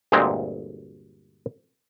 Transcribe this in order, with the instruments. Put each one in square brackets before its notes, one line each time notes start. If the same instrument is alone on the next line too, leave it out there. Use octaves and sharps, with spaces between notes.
[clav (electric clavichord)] G1 D2 A#2 G#3 C4